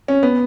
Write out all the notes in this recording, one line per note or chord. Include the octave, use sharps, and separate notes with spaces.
C#4
B3